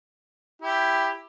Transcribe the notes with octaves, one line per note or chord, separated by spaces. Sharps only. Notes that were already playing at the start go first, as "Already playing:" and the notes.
E4 G4